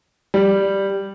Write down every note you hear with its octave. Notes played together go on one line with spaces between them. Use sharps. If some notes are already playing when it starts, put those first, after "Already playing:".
G3